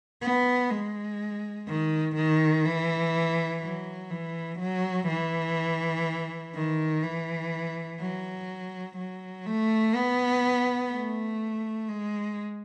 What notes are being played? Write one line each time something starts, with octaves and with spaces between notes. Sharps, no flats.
B3
G#3
D#3
D#3
E3
F#3
E3
F#3
E3
D#3
E3
F#3
F#3
A3
B3
A3
G#3